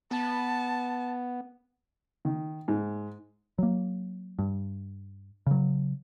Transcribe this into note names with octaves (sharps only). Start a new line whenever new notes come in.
B3 A5
D#3
G#2
F#3 A#3
G2
C#3 F#3